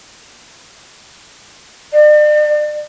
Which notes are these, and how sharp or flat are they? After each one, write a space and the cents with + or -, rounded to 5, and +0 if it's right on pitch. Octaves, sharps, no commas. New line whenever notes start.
D5 +40